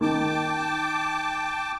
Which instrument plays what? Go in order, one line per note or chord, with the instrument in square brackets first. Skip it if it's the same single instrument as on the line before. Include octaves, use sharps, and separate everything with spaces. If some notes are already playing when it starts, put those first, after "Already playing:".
[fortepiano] D#3 [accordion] G5 A5 D6